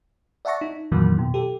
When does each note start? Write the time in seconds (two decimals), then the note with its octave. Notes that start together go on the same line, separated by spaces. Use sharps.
0.45 D5 E5 F#5 A5 C#6 A#6
0.61 D#4
0.92 F2 A#2 D#3 E3 F#3 A#3
1.19 B2
1.34 G4 A4